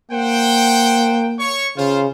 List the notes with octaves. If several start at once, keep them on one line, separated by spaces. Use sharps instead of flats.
A#3 C5 F#5 G5
C#5 C#6
C#3 F4 C5